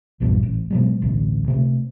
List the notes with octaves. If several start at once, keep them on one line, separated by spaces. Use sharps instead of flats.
B1 E2 G2 A#2
A1
B2 F#3 G#3
A1 D2 B2
C3 A3